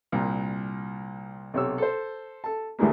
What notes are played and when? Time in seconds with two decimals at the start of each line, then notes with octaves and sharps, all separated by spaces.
0.12 C2 A#2
1.54 B1 C3 C#5 E6
1.78 A4 C5
2.44 A4 A5
2.79 D2 A2 E3 G3 G#3 A#3